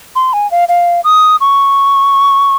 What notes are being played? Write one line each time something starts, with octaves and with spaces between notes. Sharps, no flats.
C6
G#5
F5
F5
D#6
C#6